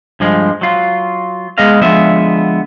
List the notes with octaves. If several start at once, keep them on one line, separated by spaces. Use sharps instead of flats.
G2 F3 G#3
F#3 F4
G#3 B3 G#4 B4 D#5 F5
D3 F3 G#3 B3 E5